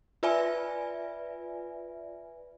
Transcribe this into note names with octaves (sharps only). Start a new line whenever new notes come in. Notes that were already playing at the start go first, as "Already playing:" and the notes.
F4 B4 D5 E5 G#5